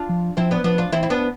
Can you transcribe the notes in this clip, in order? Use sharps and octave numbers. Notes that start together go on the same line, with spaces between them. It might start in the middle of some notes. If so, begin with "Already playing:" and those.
Already playing: D4 F4
F3
F3 C4 E4
B3 D4
F3 B3 D4
D4 F4
E3 C4 E4
E4
B3 D4